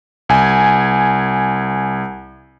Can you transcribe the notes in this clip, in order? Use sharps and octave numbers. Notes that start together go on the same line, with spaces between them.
C2 G#5